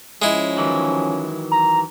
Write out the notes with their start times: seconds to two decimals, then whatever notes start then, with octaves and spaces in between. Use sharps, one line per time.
0.22 F3 G#3 C#4 E4
0.57 D#3 E3 F#3
1.52 A#5